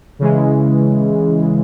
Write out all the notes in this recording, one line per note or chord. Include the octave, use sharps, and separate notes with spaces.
C#3 E3 G#3